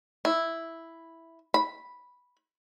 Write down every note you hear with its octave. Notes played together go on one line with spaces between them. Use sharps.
E4
B5